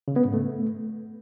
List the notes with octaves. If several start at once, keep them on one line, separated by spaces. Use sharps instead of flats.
C#3
B3
G#2
A3